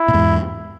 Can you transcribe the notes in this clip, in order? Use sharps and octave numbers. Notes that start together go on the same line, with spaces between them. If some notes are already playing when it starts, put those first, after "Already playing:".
Already playing: E4
A#2
E2 G#2